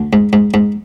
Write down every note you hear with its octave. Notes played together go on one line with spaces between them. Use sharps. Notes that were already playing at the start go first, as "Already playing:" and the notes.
Already playing: D2
G#2
G#2
G#2